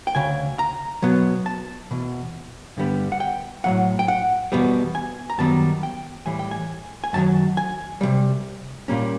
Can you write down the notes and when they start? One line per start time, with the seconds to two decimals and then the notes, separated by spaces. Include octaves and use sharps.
0.07 G5
0.15 D2 C#3 G#5
0.59 A#5
1.02 B2 F#3 B3
1.46 A5
1.91 E2 B2
2.77 G2 D3 G3 B3
3.12 F#5
3.20 G5
3.64 A2 F#3 A3 F#5
3.99 G5
4.08 F#5
4.52 E2 B2 G3 B3
4.95 G#5
5.30 A#5
5.38 F#2 D#3 G3 B3 A5
5.83 G5
6.26 A2 E3 G3 G#5
6.39 G5
6.51 G#5
7.04 G#5
7.13 F#2 D#3 F#3 A5
7.57 G#5
8.01 C3 E3 G3
8.88 A#2 G3 A#3 C#4